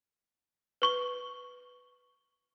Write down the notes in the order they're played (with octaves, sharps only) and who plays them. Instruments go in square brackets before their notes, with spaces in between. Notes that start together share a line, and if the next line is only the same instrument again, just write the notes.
[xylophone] B4 C#6 G7